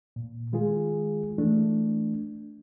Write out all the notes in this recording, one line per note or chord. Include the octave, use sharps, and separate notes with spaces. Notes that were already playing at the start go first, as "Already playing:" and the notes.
A#2
D#3 G#3 F4 G#4
E3 A3 D4